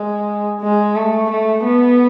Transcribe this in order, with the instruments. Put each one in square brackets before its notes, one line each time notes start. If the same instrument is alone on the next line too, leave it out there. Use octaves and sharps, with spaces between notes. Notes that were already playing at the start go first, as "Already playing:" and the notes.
Already playing: [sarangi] G#3
G#3
A3
A3
B3